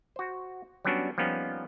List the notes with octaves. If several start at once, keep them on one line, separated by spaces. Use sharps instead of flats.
F#4 C5
F#3 G3 B3 C#4 D4 F#4
F3 G3 A#3 B3 C#4 D#4